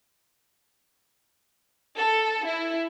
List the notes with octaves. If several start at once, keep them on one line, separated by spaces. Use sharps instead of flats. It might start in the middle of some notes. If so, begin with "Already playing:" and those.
A4
E4